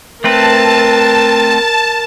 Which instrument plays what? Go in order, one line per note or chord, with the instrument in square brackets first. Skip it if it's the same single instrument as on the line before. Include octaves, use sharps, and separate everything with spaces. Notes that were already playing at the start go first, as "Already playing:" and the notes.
[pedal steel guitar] A3 C4 B4 [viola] A#4 [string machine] A5